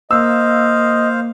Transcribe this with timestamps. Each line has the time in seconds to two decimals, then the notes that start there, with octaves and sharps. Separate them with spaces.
0.11 A#3 C5 D#5 F5 E6